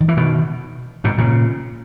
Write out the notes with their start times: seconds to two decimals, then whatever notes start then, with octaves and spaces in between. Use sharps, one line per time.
0.01 D#3
0.08 E3
0.17 B2 D#3
1.04 G#2 B2
1.18 A#2 C#3